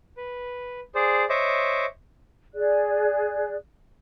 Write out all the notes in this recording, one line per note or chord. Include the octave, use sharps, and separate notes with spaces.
B4
G#4 C5 D5
C5 C#5 D#5 E5 D6
G#4 D5 F#6